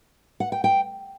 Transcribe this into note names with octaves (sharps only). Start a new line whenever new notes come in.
F#5
G5
G5